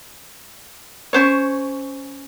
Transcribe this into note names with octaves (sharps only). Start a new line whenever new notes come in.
C#4 C5 C#5